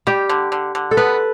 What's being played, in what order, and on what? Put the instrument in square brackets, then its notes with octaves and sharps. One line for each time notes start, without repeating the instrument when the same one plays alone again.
[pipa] G3 [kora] G4
[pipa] D3
D3
D3
[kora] A4
[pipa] B3 [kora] B4